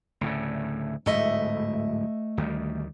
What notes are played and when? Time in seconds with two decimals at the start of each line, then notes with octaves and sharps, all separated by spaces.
0.21 D2 A2 C#3
1.06 D1 G#2 A3 D#5 E5
2.37 D2 D#3 G3